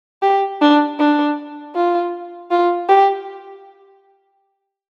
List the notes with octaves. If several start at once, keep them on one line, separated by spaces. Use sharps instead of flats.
G4
D4
D4
F4
F4
G4